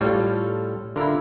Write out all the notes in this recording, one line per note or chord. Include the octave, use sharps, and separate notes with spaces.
A2 G3 C#4 F4 A4
D3 E4 F4 A#4